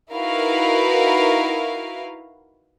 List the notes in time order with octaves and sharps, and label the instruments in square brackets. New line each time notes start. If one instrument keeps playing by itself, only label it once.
[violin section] D#4 E4 F#4 A#4 B4 F5